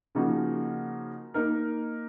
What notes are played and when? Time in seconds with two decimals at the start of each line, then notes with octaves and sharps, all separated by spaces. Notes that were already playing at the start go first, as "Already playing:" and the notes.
0.15 C#3 F3 A#3 D#4 F#4
1.34 A#3 D#4 A#4